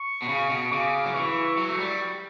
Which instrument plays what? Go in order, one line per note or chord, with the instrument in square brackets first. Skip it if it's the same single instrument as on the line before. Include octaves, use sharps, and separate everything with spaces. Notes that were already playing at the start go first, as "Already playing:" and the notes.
Already playing: [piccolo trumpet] C#6
[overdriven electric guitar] B2
C#3
B2
[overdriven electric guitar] C#3 [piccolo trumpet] D6
[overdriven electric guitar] F#3
[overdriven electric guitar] E3 [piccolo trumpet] C#6
[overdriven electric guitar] F#3 [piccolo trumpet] C#6
[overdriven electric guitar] A3
G3